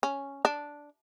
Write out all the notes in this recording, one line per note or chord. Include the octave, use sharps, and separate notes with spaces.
C#4
D4